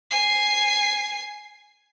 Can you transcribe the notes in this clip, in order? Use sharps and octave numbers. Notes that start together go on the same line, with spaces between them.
G#5 C7